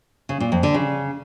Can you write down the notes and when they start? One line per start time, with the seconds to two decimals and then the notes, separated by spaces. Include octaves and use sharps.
0.29 C#3
0.40 A#2
0.52 F2
0.63 D3
0.74 C#3